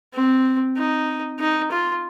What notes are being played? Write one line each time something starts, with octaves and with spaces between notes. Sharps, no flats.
C4
D#4
D#4
F4